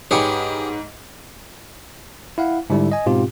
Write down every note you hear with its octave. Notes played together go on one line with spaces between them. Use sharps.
G#2 G4 G#4 B4 C#5
E4 F5 F#5
G#2 D3 G3 E4
D#5 G#5
G#2 B2 C4 F4 G4